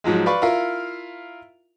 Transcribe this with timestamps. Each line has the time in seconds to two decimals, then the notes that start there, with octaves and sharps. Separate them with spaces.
0.04 G#2 F3 F#3 G#3
0.26 B4 D5 F5 B5 C#6
0.42 E4 F4 A#4 E5 F5